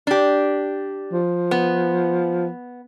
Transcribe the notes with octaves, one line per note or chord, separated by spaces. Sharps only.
D4 G4
F3
B3